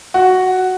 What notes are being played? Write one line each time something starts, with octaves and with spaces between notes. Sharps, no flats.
F#4